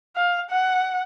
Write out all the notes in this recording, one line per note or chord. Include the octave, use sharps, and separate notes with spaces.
F5
F#5